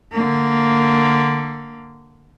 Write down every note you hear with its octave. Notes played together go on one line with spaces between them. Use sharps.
D3 A#3